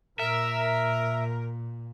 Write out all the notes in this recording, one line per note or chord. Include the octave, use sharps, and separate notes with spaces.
A#2 A#4 E5